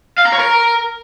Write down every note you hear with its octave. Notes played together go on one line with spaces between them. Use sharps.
F5
A#5
C#5
A#4